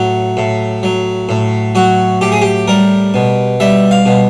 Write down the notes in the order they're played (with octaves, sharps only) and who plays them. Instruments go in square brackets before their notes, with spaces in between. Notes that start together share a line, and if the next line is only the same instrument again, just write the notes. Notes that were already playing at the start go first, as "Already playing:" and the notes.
Already playing: [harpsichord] A2 F#3
A2
F#3
A2
F#3 F#4
A2 G4
G#4
G4
G3 A#4
B2
G3 E5
F5
B2